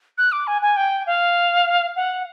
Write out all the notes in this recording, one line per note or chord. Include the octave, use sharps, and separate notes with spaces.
F#6
D6
G#5
G#5
G5
F5
F#5